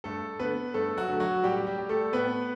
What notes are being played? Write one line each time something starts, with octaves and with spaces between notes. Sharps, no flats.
G2 A3 A4
D3 A3 B3 B4
G2 A3 A4
F#3 F#4
D3 A3
F#3 F#4
A2 G3 G4
G3 G4
G3
A3 A4
A2 B3 B4